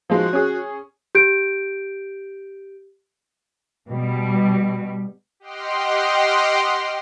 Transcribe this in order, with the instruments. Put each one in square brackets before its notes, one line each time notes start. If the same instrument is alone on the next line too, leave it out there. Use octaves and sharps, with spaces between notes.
[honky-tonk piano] F3 G#3 D#4 [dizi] F#4
[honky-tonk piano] C#4 G#4
[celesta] G4 G6 D7
[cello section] B2 G3
[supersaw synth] G4 D#5 F#5 G5 C6 F6